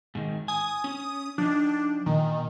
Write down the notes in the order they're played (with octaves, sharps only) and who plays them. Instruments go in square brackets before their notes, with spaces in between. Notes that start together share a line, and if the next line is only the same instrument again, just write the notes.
[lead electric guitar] G#2 D#3
[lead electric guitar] G#5 [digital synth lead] D#6
[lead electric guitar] C#4
[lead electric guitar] F3 D#4 [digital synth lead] D4
[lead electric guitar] A#2 [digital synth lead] D#3